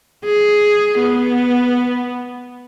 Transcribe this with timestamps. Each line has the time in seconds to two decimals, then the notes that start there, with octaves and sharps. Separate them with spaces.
0.24 G#4
0.99 B3